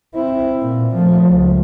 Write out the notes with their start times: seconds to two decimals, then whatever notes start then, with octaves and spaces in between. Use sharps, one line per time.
0.15 C4 E4
0.61 A#2
0.95 F3 A3
1.29 C#2